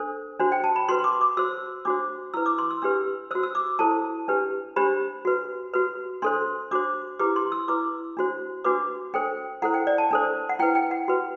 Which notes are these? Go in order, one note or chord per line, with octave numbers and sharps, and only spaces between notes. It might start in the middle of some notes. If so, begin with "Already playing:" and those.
Already playing: D4 A4 C5
D4 F#4 C5
G5
A5
B5
F#4 B4 C6
D6
D6
F#4 C5 E6
D4 F#4 C5 D6
E4 B4 E6
D6
C6
E6
D4 G4 B4 E6
F#4 C5 E6
E6
D6
E4 A4 C5 A5
D4 G4 B4
D4 G4 C5 B5
F#4 B4
F#4 B4
D4 A4 C5 C6
D4 F#4 C5 D6
E4 G4 B4 D6
C6
E6
E4 B4 D6
D4 F#4 C5
D4 F#4 B4 D6
D4 A4 C5 G5
E4 A4 C5 F#5
G5
D5
A5
D4 A4 C5
F#5
E4 B4 G5
G5
F#5
F#4 B4